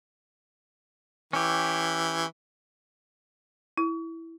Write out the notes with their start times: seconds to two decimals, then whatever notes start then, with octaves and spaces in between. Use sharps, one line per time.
1.33 E3 C#4 G4
3.77 E4